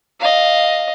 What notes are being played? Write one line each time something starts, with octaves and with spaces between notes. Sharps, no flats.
D#5 F5